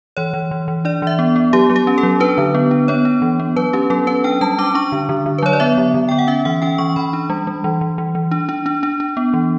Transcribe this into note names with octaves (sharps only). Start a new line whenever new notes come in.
E3 C#5
E3
E3
E3
D4 D5
E3 E5
B3
B3
F#3 G4
F#3
G4
C#4
A4
F#3
D4 B4
D3
B3
D4
B3 C#5
D4
E3
B3
F#3 B4
C#4 G4
F#3 A4
C#4 B4
D4 G5
G3 A5
D4 D6
D4 C#6
D3
D3
D3
B4
F#3 C#5
D5
B3 E5
D3
D3
B3 G5
F#5
C#4 E5
E3 F#5
C#4 G5
E3 C#6
E3 B5
D4
G3
G3
E3
E3
E3
E3
D4
D4
D4
D4
D4
B3
E3